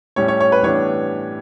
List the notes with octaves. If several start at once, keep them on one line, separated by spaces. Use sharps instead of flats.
A2 G3 C#4 C#5
C#5
C#5
B4
A2 E3 G3 B3 D4 C#5